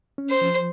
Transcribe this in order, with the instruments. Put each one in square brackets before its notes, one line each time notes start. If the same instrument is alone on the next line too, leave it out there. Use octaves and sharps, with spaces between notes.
[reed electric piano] C#4
[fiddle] C5
[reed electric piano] F3